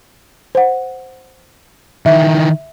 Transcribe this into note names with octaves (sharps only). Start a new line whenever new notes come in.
C5 F#5
D#3 E3 E5